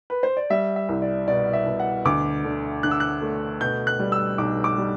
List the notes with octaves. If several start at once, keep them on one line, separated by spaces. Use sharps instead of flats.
B4
C5
D5
G3 E5
E5
C2
D5
B2 D5
E5
B2
F#5
D2 D6
D3
D3 F#6
E6
F#6
A3
B2 G6
F#6
G3
E6
B1 D6
D6
G3